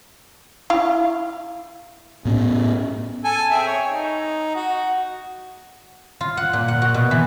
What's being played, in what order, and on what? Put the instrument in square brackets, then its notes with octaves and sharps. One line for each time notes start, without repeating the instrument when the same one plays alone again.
[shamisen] E4 F5
[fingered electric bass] A2 B3 C#4
[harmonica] A4 G#5
C4 G#4 E5
C#5
D#4
F#4
[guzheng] F4
F#5
A#2
F#5
F#4
B2
E3